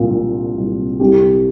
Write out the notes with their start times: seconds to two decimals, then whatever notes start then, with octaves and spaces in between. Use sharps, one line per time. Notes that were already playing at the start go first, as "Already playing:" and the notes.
Already playing: C2 A#2
0.11 A#2
0.56 C2
1.00 C2 G4